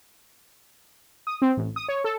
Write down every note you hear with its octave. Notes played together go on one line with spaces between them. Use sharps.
D#6
C4
A1
D#6
C#5
A4